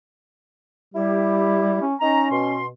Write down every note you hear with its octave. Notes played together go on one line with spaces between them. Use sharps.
G3 E4 G4
C#4
C#4 D#4 A#5
B2 C6